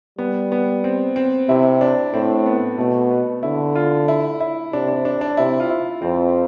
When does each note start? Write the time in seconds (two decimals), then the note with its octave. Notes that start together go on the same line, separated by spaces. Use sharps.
0.18 G3 B3
0.52 B3
0.84 C4
1.16 C4
1.48 C3 E4
1.81 D4
2.14 A2 C4
2.46 B3
2.78 B2 A3
3.11 B3
3.43 D3 E4
3.76 F4
4.08 E4
4.40 E4
4.73 C3 D4
4.88 D4
5.05 D4
5.21 D4
5.37 C3 E4
5.60 F4
5.70 E4
6.02 F2 C4